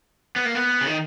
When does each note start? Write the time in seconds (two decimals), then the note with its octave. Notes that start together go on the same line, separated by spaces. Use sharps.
0.36 B3
0.45 A#3
0.55 B3
0.81 C#3
0.87 D#3